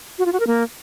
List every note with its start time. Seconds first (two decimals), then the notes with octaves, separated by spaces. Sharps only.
0.19 F#4
0.26 F4
0.33 F#4
0.40 A#4
0.47 A#3